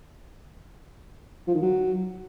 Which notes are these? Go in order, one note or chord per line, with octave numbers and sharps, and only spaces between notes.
F3
D#3
F#3